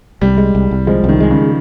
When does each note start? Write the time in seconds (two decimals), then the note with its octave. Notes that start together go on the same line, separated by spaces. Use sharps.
0.21 C2 G3
0.38 G#3
0.55 C2
0.71 C2
0.87 F3 G#3
1.04 C2
1.09 D#3
1.20 G#3
1.31 C#3